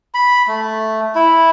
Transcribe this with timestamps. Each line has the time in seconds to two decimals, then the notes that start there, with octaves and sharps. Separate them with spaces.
0.14 B5
0.48 A3
1.15 E4